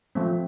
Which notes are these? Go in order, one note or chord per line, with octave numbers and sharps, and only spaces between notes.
F3 A3 C4